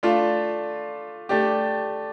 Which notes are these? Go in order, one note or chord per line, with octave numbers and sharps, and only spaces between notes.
A3 D4 F4
A3 D4 G4